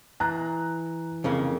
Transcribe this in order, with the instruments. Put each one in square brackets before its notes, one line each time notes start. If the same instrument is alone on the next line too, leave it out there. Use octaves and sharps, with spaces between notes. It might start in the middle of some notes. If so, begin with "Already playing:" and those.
[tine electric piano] E3 [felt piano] A#5 F#6
[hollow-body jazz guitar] F2 C#3 A#3